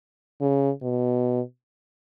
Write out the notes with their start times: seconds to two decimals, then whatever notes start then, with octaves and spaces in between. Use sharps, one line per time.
0.41 C#3
0.82 B2